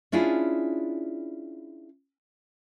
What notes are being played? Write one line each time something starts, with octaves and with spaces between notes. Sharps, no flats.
C#4 D4 E4 F4 G#4